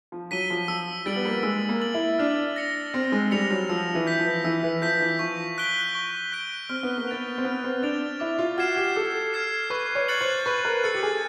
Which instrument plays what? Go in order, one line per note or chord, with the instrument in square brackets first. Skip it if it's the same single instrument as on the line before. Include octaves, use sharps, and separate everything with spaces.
[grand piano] F3
[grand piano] F#3 [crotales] B6 D#7 G7
[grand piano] F3
[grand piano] F3 [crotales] E6
[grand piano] G3 [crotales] A6 D7 F#7
[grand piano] B3
A#3
[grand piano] G#3 [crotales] E6
[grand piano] A#3
[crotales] A6 D7 F#7
[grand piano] E4
[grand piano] D4 [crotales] F6
[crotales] A#6 C#7 F7
[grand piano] C4 [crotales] F6
[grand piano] G#3
[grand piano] G3 [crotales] A#6 C#7 F7
[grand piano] F#3
[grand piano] F3 [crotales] E6
[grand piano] E3
[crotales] G6 B6
[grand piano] F3
[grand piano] E3 [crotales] E6
[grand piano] E3
[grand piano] F3 [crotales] G6 B6
[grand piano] E3
[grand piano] F3 [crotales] C#6
[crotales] F#6 B6 D7 G7
C#6
F#6 B6 D7 G7
[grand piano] C4 [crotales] F6
[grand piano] B3
A#3
[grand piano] B3 [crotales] A6 D7 F7
[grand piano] C4
[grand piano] B3 [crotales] F6
[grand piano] C4
[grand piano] D4 [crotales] A6 D7 F7
[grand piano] E4 [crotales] D6
[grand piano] F4
[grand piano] F#4 [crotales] F6 G#6 C7 E7
[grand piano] G4
[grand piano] A4 [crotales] D6
[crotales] F6 G#6 C7 E7
[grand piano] B4 [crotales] C#6
[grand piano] C#5
[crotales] F#6 A6 C#7 F#7
[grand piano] C5
[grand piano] B4 [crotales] C#6
[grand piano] A#4
[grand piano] A4 [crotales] F#6 A6 C#7 F#7
[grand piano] G4
G#4